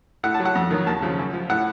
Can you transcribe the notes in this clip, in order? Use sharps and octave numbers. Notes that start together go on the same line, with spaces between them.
A2 F#5
A5
F#3
F#5
F2
D#3 F#3
D#2 A5
C#3 F3
F#2
F3
A2 F#5